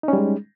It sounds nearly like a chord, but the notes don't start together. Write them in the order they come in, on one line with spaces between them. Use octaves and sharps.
D#4 C#4 G3 G#3